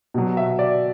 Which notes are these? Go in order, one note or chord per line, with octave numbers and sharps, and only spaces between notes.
B2 F#3
E5
D5